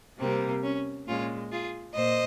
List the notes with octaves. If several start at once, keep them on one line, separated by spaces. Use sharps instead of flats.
C3 G3 A#3 C4
C#4
A#2 G#3 C#4 F4
F4 G#4
A#2 C5 D#5